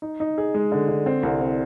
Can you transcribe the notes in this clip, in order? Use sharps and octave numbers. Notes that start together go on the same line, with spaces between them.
D#4
D#4
G#4
G#3
D3
D3
C4
C2
C4